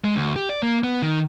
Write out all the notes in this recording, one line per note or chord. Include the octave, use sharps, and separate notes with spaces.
G#3
D2
G4
D5
A#3
B3
D#3